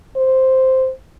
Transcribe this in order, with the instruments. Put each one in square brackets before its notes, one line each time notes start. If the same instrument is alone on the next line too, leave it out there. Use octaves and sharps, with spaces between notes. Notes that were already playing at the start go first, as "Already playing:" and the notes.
[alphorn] C5